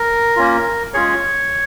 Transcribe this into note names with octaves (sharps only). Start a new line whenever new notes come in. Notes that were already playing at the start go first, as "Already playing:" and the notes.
Already playing: A#4
A#3 C#4 F4
G#3 C#4 F4 G#4 C#5